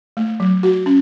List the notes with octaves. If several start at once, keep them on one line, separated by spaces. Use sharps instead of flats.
A3
F#3
F#4
C#4